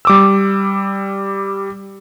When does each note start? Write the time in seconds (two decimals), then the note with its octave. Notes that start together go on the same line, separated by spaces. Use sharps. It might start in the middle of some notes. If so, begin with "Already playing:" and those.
0.05 G3 D6 E6